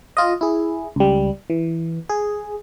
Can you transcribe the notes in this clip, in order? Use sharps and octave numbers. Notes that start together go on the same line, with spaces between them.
F4 D#5
E4 G#4
C#2 G3
E3
G#4